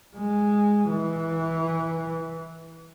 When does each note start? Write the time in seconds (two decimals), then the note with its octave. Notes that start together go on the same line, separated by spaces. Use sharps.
0.17 G#3
0.90 E3